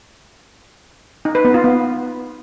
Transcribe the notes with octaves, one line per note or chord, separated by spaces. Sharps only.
D#4
B4
B3
F4
B3